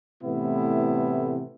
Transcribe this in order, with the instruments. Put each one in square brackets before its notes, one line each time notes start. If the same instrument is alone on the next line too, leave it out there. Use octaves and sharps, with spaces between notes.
[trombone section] A2 C3 E3 A3 B3 E4